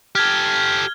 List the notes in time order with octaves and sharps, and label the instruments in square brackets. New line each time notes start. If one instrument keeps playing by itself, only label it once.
[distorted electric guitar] G4 A4 [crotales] F6 G#6 G7